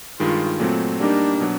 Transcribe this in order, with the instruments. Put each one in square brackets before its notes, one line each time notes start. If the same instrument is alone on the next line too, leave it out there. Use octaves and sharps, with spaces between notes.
[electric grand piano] G2 D#3 G#3 [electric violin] F4
[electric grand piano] A#2 F#3 A3 C4
[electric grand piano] G3 A#3 D#4 G4 A#4 [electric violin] D4
[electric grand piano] B2 F#3